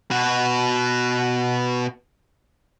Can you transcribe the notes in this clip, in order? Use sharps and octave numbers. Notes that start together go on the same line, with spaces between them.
B2 F#4